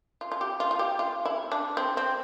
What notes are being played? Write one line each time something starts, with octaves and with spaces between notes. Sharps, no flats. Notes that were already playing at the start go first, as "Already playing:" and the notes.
F4
F4
G4
F4
F4
G4
F4
E4
D4
C4
C4